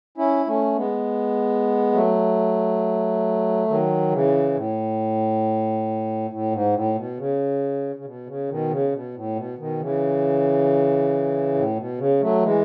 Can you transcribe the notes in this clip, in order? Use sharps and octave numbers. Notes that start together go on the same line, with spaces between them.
C#4 E4
A3 C#4
G#3 B3
F#3 A3
D#3 F#3
C#3 E3
A2
A2
G#2
A2
B2
C#3
C#3
B2
C#3
B2 D#3
C#3
B2
A2
B2
B2 D#3
C#3 E3
A2
B2
C#3
F#3 A3
E3 G#3